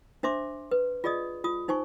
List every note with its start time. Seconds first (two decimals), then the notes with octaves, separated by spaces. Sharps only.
0.23 D4 C5 E5 C6 D6
0.71 B4
1.04 F4 G#4 D5 D#5 D#6
1.44 F4 D#6
1.68 D#4 C5 G#5 C#6